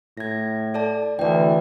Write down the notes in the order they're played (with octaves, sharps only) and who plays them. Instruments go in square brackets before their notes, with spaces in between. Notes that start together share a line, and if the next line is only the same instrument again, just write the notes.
[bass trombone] A2 [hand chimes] G#6 A#6
[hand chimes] A4 D5 A5
[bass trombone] D2 [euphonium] E3 [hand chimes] D5 G5